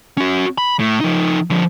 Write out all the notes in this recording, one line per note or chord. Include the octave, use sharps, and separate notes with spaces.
C#4 F#4
B5
A2
F3 D#4
D3 F3